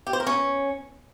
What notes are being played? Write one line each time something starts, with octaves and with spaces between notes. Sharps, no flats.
G4
C5
A#4
C#4